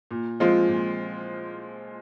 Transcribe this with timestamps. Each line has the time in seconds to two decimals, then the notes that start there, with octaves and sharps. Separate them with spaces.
0.11 A#2
0.40 F3 G#3 C4 F4
0.69 A#2